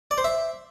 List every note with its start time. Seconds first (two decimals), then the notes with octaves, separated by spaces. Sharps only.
0.11 D5
0.18 C5
0.24 E5